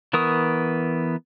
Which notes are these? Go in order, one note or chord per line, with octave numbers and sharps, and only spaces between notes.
E3 B3 A#4 C#6 D#6